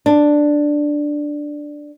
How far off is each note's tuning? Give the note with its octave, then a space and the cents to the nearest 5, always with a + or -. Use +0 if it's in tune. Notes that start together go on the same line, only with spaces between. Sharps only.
D4 +5